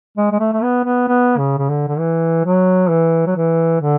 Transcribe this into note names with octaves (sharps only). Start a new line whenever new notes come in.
G#3
G#3
A3
A3
B3
B3
B3
C#3
C#3
D3
D3
E3
F#3
E3
F#3
E3
D3